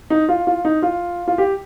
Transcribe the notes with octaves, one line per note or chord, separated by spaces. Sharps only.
D#4
F4
F4
D#4
F4
F4
G4